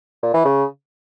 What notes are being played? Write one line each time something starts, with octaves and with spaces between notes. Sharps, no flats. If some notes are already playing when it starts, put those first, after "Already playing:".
A#2
E3
C#3